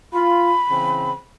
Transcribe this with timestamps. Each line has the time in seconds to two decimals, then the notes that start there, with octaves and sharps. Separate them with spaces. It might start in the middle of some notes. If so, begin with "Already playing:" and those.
0.13 F4 B5
0.69 C#3 E3 C4